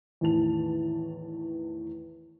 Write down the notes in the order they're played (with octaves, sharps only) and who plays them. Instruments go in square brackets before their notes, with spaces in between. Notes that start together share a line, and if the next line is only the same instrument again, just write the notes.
[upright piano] E2 A2 D#3 E3 A5 F7